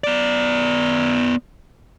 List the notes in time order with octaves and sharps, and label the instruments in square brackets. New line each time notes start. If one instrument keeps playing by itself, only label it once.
[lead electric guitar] B3 D5